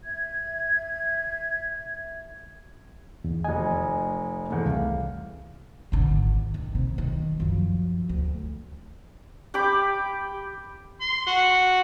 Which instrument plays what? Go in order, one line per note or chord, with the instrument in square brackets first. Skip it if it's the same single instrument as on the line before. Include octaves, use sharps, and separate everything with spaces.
[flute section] E5 G#6
[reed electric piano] E2
[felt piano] F1 D#5 [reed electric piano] G#5
[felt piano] E2 A3
[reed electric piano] C2 [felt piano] F5
[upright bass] G#1 D3
D#3
C3
D#3
F#2 F3
D2
[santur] G4 G5 B5 D6
[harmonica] C6
F#4